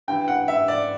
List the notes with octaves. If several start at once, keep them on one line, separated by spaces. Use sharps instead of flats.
G2 E3 G5
F#5
E5
D5